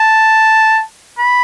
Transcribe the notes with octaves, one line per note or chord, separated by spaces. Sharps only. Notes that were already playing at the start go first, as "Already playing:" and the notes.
Already playing: A5
B5